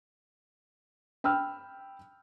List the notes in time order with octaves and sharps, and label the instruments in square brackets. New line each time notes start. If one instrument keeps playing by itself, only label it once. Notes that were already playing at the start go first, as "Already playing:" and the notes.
[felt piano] G5 B5 E6 F6